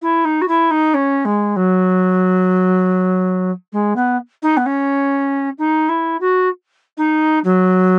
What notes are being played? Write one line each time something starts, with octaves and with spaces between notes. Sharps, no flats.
E4
D#4
F#4
E4
D#4
C#4
G#3
F#3
G#3
B3
D#4
B3
C#4
D#4
E4
F#4
D#4
F#3